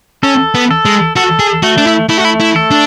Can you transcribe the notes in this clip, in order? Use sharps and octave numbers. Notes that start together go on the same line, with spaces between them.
C#4 A4
B3
A4
G#3
F#4 A4
G#4
A3 F#4
D4
E4
A3 E4
F#4
E4
E4
A4
D4